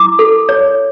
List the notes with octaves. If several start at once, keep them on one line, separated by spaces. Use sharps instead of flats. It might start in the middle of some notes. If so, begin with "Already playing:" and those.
Already playing: E4 D6
A4
C#5